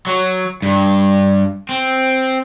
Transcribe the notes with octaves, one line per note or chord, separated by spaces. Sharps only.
F#3
G2
C4